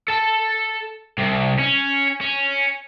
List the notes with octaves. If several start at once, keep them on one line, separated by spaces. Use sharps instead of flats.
A4 A5
C2 C3
C#4
C#4